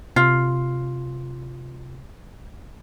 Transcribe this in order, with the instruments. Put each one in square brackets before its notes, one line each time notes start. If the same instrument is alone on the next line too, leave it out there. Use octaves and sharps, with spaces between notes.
[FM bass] C3 [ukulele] F4